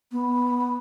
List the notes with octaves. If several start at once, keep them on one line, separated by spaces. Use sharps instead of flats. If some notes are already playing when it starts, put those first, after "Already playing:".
B3